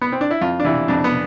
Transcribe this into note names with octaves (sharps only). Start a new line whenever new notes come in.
B3
C4
D4
E4
F2 F4
D4
C3 E3 E4
F2 D4
B3